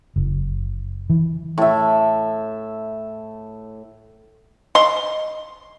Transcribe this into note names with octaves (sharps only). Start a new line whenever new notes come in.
F#1
E3
A2 E5
D#5 C6